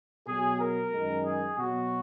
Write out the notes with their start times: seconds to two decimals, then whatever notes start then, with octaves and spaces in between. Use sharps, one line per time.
0.26 B2 F#3 G#4
0.59 A#4
0.91 F#2 D#3 G#3
1.24 G#4
1.57 B2 F#3 F#4